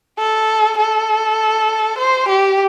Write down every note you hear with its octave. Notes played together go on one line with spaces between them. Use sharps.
A4
A4
C5
G4